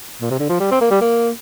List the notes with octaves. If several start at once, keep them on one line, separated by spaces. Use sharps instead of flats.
A#2
C3
D3
F3
G3
C4
A#3
G3
A#3